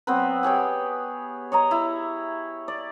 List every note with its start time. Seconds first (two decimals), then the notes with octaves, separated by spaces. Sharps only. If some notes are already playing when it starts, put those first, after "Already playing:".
0.07 F#3 B3 C4 B4
0.43 G4 G#4 C#5 G5
1.52 C#5 D#5 A#5
1.71 E4
2.68 D5